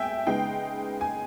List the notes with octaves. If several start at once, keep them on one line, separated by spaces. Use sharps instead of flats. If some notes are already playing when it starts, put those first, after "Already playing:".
Already playing: G#3 B3 E5 G5 G#5
C#3 G#3 B3 D#4 G5
G#5